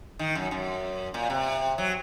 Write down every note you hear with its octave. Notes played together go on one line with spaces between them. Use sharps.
D#3
F#2
F#2
A#2
C3
F#3